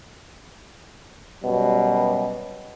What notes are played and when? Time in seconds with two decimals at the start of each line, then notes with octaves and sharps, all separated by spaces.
1.43 F#2 B2 G3